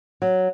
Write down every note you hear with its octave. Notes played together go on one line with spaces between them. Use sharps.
F#3